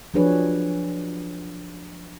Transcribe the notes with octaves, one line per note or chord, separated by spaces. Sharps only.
F3 F#3 D4 G#4 B4 C#5